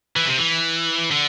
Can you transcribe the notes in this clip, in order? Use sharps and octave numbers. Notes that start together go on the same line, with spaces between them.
E3
C3
E3
D3